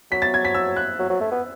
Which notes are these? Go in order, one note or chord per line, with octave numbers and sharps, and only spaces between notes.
F#3 B6
A6
G#6
B6
E6
F#6
F#3
F#3
A3
B3